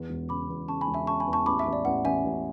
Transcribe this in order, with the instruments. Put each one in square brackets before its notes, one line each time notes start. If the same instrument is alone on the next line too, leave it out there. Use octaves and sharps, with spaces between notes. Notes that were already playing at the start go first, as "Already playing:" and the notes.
Already playing: [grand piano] E2
E1
[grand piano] C#3 [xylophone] B5 D6
[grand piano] E2
[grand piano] C#3 [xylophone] A5 C#6
[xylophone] G#5 B5
[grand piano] E1
[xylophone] E5 G#5
[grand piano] C#3 [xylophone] A5 C#6
[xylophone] G#5 B5
[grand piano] E2
[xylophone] A5 C#6
[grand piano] A1 [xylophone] B5 D6
[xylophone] E5
[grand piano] A1
[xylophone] D5
[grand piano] A1 [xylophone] F#5
[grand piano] A1 [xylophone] E5 G#5
[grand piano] A1